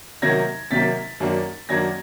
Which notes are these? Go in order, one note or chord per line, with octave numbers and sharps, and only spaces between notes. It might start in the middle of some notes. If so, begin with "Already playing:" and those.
C3 D#3 F#3 A#3 G#6 A#6
C3 D#3 F#3 A#3 A6 B6
F#2 D#3 F#3 A#3 D4
F#2 D#3 F#3 A#3 D4 G#6 A#6